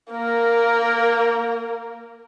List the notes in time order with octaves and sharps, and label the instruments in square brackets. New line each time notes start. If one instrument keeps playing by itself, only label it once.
[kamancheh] A#3 A#4